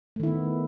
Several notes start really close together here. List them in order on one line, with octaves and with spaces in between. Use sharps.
A3 D#3 E4 B3